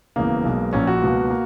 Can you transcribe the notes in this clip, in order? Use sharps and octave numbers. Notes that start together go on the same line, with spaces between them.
E1 E2 C#3 A#3
B1 B2 G#3
A#1 A#2 A#3 C#4
F#4
C#2 B2 A#3
A#3